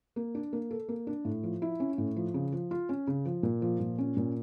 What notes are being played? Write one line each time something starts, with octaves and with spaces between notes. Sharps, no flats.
A#3
D4
A#3
A4
A#3
D4
A2
F3
E4
C#4
A2
F3
C#3
F3
F4
C#4
C#3
F3
A#2
F3
A#2
C#4
A#2